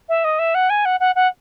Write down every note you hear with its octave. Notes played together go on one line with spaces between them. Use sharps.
E5
D#5
E5
F#5
G#5
F#5
F#5
F#5